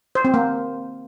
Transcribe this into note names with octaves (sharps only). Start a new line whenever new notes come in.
C5
C4
A#3